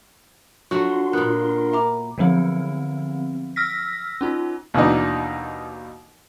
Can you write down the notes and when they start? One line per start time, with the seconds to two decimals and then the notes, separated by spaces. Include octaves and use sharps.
0.71 F#3 A3 D4 F4 F#4 A4 C6 C#6
1.13 A#2 B3 A#4 F#6
1.73 E5 A#5 D6
2.18 D3 F3 F#3 B3 C4
3.56 E6 F6 A#6 B6
4.21 C#4 D#4 F4
4.74 D#2 B2 E3 D4 D#4